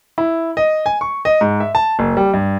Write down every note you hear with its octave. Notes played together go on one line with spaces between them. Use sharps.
E4
D#5
G#5
C#6
D#5
G#2
E5
A5
F#1
G3
G2